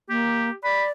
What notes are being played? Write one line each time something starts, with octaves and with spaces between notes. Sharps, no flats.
A#3 G4
D5 B5